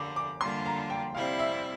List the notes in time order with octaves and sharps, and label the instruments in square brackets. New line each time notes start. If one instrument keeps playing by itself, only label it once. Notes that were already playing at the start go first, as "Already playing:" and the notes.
Already playing: [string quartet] D3 G3 A#3 [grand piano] D6
[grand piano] D6
[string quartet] D3 G3 A#3 D4 F4 [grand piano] C6
[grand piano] A#5
G5
[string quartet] C3 G3 C4 E4 [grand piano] F5
[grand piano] E5